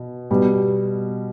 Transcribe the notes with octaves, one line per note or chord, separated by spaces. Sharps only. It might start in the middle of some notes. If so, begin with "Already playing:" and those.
Already playing: B2
B2 G3